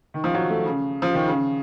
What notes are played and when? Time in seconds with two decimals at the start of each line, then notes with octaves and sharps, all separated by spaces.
0.14 D#3
0.24 F3
0.34 F#3
0.50 A3
0.65 C#3
1.02 F3
1.14 D#3
1.28 C#3